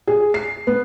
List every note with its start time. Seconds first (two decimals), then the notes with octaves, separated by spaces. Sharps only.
0.07 G#4
0.34 C7
0.67 B3